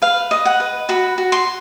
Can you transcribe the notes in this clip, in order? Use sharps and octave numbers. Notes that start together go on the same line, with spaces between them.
B4 F5
D#5
F#5
B4
F#4 B5
F#4
C6